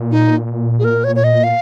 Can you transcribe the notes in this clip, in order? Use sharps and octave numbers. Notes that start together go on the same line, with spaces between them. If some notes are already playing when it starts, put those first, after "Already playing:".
Already playing: A#2
D#4
G#4
A#4
C#5
C#5
D#5
F5